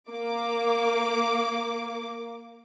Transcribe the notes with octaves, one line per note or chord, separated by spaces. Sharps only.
A#3 D6